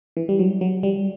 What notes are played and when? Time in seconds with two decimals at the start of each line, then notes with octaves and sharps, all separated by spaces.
0.17 E3
0.29 G3
0.39 F#3
0.61 F#3
0.83 G3